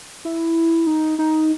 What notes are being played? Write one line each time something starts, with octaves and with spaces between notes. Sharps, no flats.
E4
D#4
D#4